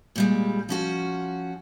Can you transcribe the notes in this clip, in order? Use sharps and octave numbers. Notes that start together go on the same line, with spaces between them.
A#2 G3 G#3
F3 C#4 F#4